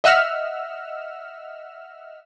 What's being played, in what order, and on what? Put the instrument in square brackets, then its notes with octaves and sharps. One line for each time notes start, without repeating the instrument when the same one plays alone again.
[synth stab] D#5 E5 F#5 E6 F6